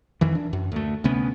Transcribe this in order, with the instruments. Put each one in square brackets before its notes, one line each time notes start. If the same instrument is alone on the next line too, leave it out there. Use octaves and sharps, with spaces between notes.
[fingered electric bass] F2 D#3 E3
D4
F#2
D2 A3
D2 C3 B3 C#4